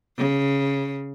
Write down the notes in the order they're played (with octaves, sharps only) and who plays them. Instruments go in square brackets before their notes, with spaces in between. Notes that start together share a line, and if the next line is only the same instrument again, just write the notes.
[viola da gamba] C#3